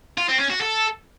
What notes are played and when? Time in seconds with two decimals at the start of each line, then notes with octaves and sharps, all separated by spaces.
0.18 F4
0.29 C4
0.39 C#4
0.50 F#4
0.61 A4